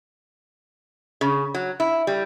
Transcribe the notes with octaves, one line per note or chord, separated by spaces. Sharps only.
C#3
F#3
E4
G3